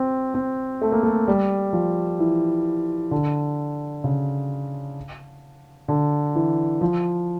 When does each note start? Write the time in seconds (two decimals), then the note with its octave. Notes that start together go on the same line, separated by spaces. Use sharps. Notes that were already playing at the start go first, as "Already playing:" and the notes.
Already playing: C4
0.34 C4
0.82 A3
0.92 A#3
1.03 A3
1.28 G3
1.73 F3
2.19 E3
3.11 D3
4.04 C#3
5.88 D3
6.35 E3
6.81 F3